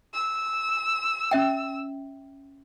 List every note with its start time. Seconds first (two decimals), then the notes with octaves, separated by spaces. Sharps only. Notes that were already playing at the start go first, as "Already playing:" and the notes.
0.14 E6
1.31 C#4 E5 G5